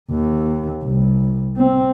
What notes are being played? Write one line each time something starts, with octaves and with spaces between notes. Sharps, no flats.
D#2
C2
C4